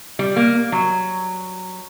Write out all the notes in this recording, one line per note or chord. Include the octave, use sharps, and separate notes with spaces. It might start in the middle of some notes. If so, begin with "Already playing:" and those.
G3
A#3
F#3